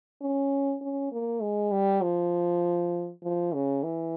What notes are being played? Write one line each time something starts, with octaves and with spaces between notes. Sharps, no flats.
C#4
C#4
A#3
G#3
G3
F3
F3
C#3
E3